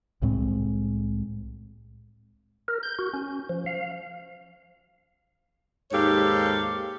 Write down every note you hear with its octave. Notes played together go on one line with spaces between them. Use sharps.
C2 A2 G#3 C4
A#4
G6
F#4
C#4
F3
F5
D#2 G#2 G4 A4 C#5 F5